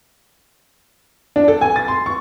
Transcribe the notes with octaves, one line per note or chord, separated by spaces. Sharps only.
D4
A4
G#5
A6
C6
C#6